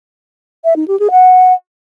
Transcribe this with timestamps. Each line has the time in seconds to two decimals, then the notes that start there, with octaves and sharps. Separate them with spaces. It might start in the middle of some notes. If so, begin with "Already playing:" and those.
0.64 E5
0.76 D#4
0.88 G4
0.99 G#4
1.11 F#5